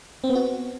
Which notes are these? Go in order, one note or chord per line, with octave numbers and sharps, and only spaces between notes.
C4
B3
F#4